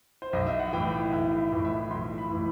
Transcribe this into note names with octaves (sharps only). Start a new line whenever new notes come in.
C5
B1 D#5
E5
F#5
A2 E3 G5
B1 E5
E5
A2 E3
E5
B1 C6
B5
A2 E3